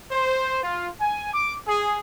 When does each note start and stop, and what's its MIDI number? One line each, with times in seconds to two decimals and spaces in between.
0.12 0.62 72
0.63 0.87 65
1.01 1.33 80
1.34 1.55 86
1.66 2.00 68